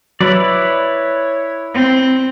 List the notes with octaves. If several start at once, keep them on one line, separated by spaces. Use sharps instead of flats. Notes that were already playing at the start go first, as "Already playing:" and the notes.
F#3 E4 B4 C#5 D5
C4